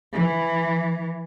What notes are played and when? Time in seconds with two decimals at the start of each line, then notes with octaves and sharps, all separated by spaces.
0.13 E3